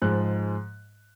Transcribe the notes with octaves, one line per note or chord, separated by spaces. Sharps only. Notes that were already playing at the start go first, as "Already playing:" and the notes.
G#2 F3 G#3 F#6